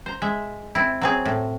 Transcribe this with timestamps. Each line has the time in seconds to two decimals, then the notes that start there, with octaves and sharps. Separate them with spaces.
0.06 C5 A#5
0.22 G#3 E5
0.75 C4 E4
1.02 F#3 C4 G#4
1.25 A2